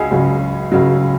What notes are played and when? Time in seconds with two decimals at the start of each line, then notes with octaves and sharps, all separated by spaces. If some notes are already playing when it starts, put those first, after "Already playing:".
Already playing: C#2 C#3 F#4 G#4
0.11 C#2 C#3 F#3
0.72 C#2 C#3 F#3